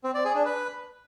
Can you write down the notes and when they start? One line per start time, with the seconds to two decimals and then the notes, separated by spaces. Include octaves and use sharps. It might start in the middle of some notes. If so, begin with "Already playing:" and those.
0.04 C4
0.14 D5
0.25 G#4
0.35 D4
0.45 B4